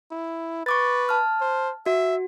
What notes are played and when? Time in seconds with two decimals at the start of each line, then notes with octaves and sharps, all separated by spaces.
0.11 E4
0.66 B4 C#6 D6 A6
1.09 A5 F6
1.41 C5
1.86 F#4 E5